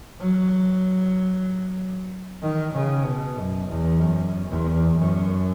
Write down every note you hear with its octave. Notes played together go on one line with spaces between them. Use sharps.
F#3
D#3
C#3
B2
F#2
E2
F#2
E2
F#2